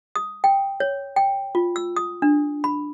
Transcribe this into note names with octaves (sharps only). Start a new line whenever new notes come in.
D#6
G5
C#5
G5
F4
E6
D#6
D4
B5